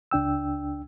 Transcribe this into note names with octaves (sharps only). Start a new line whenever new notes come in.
C#2 D4 G5 E6